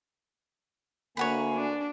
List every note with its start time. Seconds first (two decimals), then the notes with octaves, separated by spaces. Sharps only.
1.17 D2 A#3 C#5 F#5 G#5 B5
1.55 D4